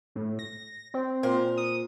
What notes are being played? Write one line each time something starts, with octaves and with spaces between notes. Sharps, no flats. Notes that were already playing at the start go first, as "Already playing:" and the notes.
A2
A#6
C4
A#2 A#4 C5
D#6